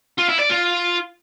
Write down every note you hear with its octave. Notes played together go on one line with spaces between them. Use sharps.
F4
E4
D5
F4